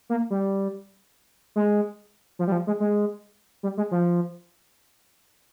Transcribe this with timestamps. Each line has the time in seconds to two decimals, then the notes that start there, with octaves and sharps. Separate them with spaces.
0.10 A#3
0.30 G3
1.56 G#3
2.39 F3
2.47 G3
2.52 F3
2.67 G#3
2.80 G#3
3.63 G3
3.77 G#3
3.91 F3